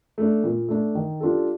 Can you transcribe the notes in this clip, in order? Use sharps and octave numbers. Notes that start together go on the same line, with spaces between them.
A3 D4
A#2
A3 D4
D#3
G3 D4 F4 A4